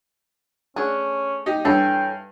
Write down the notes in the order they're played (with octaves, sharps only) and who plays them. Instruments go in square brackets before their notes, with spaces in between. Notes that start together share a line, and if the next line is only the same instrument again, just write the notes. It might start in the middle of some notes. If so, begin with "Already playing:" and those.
[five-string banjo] A3 D4 G#4 [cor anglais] C#4
[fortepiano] D#4 G4
[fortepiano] G2 [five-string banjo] E3 C#4 A4 [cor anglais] G5